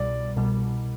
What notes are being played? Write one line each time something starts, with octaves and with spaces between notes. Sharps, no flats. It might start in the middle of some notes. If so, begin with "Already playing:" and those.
Already playing: C2 B2 G3 D5
C2 B2 G3